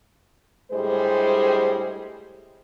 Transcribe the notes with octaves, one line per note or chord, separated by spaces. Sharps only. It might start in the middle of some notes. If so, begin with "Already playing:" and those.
D2 A2 G3 G#3 G#4 C5